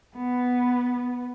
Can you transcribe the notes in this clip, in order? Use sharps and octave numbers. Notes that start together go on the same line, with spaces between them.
B3